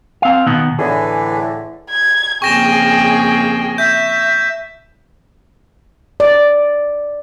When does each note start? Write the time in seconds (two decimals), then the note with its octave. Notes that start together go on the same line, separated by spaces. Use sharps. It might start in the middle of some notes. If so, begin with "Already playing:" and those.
0.22 C4 F5
0.47 B2 D#3 B3
0.79 A2 D3 E3 G#4
1.90 G#6
2.42 F2 C#3 A#3 G#4 G5 C#6 A#6 E7
3.78 E5 G6
6.20 D5